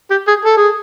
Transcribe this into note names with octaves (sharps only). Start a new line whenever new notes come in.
G4
G#4
A4
G#4